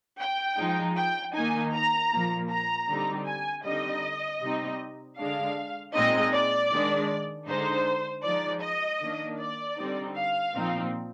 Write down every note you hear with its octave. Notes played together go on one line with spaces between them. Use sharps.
G5
F3 G#3 D#4
G5
D#3 A#3 D#4 G#5
A#5
A#2 F3 A#3
A#5
D3 G3 C4 D#4
G#5
D3 G3 C4 D#4 D#5
C3 G3 C4 D#4
D3 G#3 D4 F5
A#2 G#3 C4 D#4 D#5
D5
D#3 G#3 D4
D3 G#3 D#4 C5
F3 G#3 D#4 D5
D#5
D#3 A#3 D4
D5
D3 G3 C4 D#4
F5
A#2 F3 C4 D#4